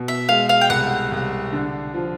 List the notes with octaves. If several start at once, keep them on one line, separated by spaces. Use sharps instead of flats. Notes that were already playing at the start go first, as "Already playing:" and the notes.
Already playing: B2
E5
G#3 F5
F5
G5
C2 F#5
C2
D3
F3